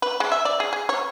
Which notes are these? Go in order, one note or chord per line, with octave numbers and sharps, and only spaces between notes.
B4
G#3
E5
D5
G#4
G#4
C#5